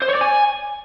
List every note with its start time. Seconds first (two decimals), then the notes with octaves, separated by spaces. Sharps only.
0.02 C5
0.08 C#5
0.15 D5
0.21 G#5